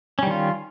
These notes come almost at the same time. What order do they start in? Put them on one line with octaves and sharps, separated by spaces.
C#4 G3 D#3 F4